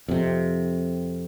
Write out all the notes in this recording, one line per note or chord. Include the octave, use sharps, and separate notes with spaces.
F2 C3